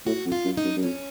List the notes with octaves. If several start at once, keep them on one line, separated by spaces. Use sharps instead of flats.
A2 F#4
F2
F4
F#2
D#4
F#2
F#2
F2 C#4